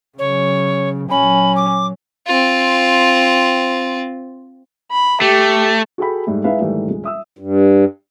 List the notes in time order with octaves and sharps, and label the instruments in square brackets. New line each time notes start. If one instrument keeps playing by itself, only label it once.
[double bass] C#3 F#3 [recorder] C#5
[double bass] A#2 F#3 [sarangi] C#4 [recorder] B5
[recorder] D6
[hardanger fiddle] C4 F4
[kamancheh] B5
[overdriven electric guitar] A3 [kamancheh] G4
[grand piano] F#4 G#4 A4 G5 B5
G#2 G3 A3
G#3 D#4 E4 B4 E5 F5
G#2 D#3 E3 G3 A3
D#1 G#3
E5 D#6 E6
[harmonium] G2